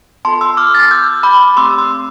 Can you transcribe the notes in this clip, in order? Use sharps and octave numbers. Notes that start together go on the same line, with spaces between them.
B3 F4 A4 A5 C6
C6 E6
D6 F6
F6 A6
E6 G6
B5 D6
A3 C4 G4 C6 E6
C6 E6